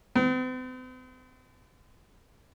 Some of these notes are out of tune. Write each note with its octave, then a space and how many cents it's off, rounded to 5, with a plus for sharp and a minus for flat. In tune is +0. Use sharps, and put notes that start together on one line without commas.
C4 -45